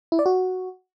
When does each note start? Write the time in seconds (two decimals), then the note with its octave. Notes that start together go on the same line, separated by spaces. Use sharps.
0.12 E4
0.19 D5
0.26 F#4